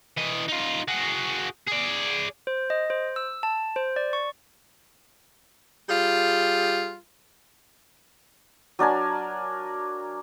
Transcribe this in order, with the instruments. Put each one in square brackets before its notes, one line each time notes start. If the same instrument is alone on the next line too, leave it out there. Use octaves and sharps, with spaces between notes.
[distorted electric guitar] E3 D#5
D#4 F4
F#4 G#4
G#4 D5
[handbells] C5
D#5
C5
E6
A5
C5
D5
C#6
[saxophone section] G3 F4 G#4
[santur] F#3 D4 A#4 G#5